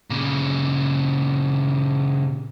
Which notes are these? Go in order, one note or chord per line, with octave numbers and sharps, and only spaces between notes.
A#2 C#3